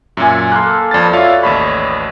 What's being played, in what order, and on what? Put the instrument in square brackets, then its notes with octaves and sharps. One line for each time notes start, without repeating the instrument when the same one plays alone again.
[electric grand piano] F#2 A#2 [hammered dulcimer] E5 G#5
[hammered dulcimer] A#3 A4 [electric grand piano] C6 F#6
[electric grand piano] F2 A6 [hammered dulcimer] B4 D5
[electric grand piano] F4 C#5 F5 [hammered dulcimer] F#4 E5
[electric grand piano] A1 D#2 B5 [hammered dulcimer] C#5